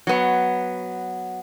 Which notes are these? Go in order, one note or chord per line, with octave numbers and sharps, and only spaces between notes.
F#3 B3